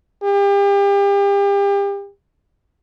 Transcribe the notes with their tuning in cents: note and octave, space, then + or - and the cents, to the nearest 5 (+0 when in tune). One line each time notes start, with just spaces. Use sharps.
G4 +35